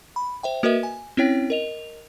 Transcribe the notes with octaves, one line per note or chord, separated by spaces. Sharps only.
B5
C5 E5 G5
A#3 F#4 A#4 B4 D#5 E5
G#5
C4 C#4 E4 C#5 G5
A#4 D#5 F7